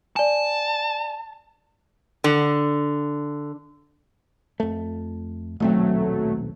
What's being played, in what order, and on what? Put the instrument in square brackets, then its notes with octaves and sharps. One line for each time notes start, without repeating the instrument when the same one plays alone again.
[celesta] D5 G#5 [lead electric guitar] A5
[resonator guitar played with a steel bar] D3
[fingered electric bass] F2 A3
[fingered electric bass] D#1 B1 C4 [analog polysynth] F#3 A3